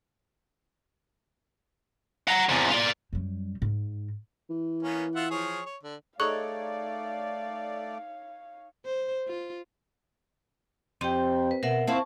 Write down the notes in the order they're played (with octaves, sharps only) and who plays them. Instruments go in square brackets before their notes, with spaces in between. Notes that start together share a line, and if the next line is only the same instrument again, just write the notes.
[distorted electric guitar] F#5 A#5
E2 C3
F4 D5
[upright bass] F#2 G3
G#2
[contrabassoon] E3
[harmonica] A#3 B3 C#4
F4 E5 F#5
F3 G#4 C#5
C#5
D3
[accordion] A3 D5 [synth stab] D#4 C#5 [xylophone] G#4 A4 F#6 [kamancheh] F5
[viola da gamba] C5
F4
[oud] F2 [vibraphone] C4 G4 G5
[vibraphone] B4
[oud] B2 [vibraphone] A#4 E5 F#5
[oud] C4 E4 F4 [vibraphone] A5 C#6